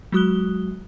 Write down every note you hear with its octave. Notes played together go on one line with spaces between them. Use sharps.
F#3 G#3 F#4 D#6 F#6 G7